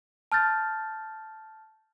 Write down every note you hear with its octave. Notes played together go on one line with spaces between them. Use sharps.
A5 F6 G6 A6